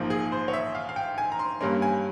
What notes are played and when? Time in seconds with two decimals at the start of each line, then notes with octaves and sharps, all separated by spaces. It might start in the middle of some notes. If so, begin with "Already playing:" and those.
Already playing: A#1 G#2 F3 A#3
0.10 G#4
0.32 C5
0.48 C#5
0.53 E5
0.75 F5
0.89 F5
0.96 G5
1.18 G#5
1.32 A#5
1.39 C6
1.61 G2 G3 A#3 C#4 C6
1.82 G#5